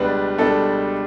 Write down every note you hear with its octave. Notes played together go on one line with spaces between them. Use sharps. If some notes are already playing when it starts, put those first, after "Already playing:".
Already playing: C#2 B2 G3 D4 B4
C#2 B2 G3 D4 A4